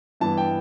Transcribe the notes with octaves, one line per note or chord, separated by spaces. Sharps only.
G2 E3 B3 A5
G5